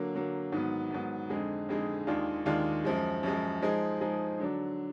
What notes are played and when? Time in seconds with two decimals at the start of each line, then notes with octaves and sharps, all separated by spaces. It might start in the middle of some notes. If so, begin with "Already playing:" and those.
Already playing: D3 F#3 A#3
0.14 D3 F#3 A#3
0.52 G#2 D#3 F#3 B3
0.91 G#2 D#3 F#3 B3
1.30 F2 D3 G#3 D#4 G#4
1.69 F2 D3 G#3 D#4 G#4
2.07 D#2 D#3 G#3 D4 F4
2.45 D#2 D#3 G#3 D4 F4
2.85 F#2 F3 G#3
3.23 F#2 F3 G#3
3.62 F3 G#3 D#4 G#4
4.01 F3 G#3 D#4 G#4
4.40 D3 F#3 D4